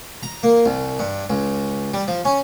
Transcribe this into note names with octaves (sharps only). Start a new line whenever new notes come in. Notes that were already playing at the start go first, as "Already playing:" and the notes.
A#5
A#3
C2
G2
C#2
G3
F3
C#4